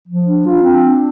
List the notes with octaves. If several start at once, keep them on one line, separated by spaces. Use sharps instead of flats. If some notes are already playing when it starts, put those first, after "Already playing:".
F3
D4
F4
C4
D4